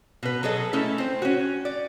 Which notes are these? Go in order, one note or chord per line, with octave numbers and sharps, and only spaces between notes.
B2 B4
F#3 G#4 A4 D#5
A3 C#4 E4 A4
C4 C5
C#4 F#4
D5